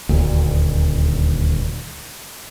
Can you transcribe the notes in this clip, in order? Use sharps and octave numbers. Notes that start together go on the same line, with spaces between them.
D#1 D2